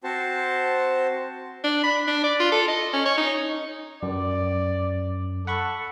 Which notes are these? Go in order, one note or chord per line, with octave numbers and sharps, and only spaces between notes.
C4 F#4 C5 A5
D4
B5
D4
D5
F4
A4
D#5
C#4
C#5
D#4
F#2 D5
A4 F#5 B5 C#6